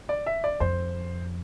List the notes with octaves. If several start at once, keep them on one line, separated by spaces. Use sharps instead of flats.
D5
E5
D5
F2 C5